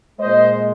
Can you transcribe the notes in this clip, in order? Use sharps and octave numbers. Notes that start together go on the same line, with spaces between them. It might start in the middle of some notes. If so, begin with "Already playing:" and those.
A#2 G#3 C5 D#5